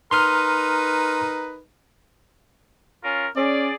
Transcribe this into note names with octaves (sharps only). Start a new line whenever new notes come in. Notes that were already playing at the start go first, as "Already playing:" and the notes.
D#4 A#4 B4 C6 F6
C#4 F4 A#4
C#4 G#4 D5